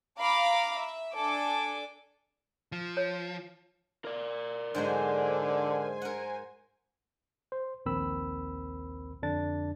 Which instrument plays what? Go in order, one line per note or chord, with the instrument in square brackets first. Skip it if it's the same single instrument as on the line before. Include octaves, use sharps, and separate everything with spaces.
[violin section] F5 A#5 B5 D6
E5
D4 A4 G#5 D6
[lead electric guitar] F3
[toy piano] C#5
[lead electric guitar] A#4 D5
[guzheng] G#2 F#3 G#3 [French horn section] D3 [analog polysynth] C5 G#5
[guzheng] A#4 F#5
[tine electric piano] C5
A#1 D#2 C4 A#4 B5 E6
F2 D3 D4 A6